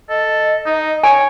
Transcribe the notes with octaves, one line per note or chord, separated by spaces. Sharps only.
A4 D#5
D#4
C#5 G#5